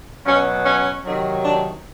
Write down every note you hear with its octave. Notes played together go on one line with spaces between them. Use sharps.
B2 F#3 C#4
C#4
C3 D#3 F#3
D4